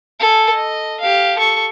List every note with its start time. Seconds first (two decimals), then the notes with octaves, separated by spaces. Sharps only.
0.19 A4 G#5
0.54 D#5
1.00 G4 F5
1.38 A4 C#6